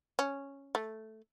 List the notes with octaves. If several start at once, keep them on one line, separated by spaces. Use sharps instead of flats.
C#4
A3